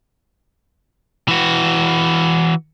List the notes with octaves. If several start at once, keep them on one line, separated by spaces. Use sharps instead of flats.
E3 F#4